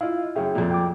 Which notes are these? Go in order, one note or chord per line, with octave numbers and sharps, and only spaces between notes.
E4 F4 D#5 F5
F#2 C#3 G#4 E5 G5
F2 A#2
G5 D6